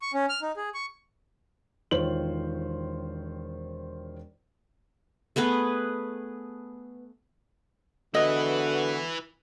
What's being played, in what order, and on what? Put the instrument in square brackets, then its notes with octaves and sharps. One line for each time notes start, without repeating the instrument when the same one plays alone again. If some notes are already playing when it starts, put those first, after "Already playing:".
[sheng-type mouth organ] C#6
C#4
F6
D#4
G#4
C#6
[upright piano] E1 D#3 F4 C5 C#5 F#7
[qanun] A3 B3 G#4 B4
[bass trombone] D3 [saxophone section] G#3 B3 F#4 [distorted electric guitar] E4 B4 [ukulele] D#5